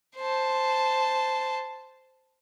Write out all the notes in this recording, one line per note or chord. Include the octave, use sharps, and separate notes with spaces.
C5 A5